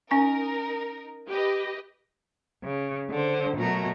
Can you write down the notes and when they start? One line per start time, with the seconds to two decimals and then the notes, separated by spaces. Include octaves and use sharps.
0.11 C#4 D#4 A#4 G#5 C#6
1.29 G4 B4 D#5
2.64 C#3
3.11 D3 C5
3.58 B2 F#3 A3 A#4